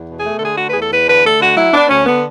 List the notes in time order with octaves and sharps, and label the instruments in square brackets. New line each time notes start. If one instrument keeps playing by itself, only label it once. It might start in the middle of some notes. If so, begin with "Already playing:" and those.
Already playing: [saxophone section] E2
B2
G#4
A3
A4
D3 G#4
A3 F#4
B4
E2 G#4 A4
E2 B4
D3 B4
A3 A4
D3 F#4
F#3 E4
B3 D4
D2 C#4
D3 B3